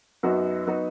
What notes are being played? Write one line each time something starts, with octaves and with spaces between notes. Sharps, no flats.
F#2 F#3 B3 D#4 F#4
F#3 B3 D#4 F#4